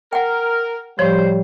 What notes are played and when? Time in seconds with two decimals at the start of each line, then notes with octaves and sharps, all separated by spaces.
0.13 A#4 F#5 G5
0.99 A2 F3 G3 C5 C#5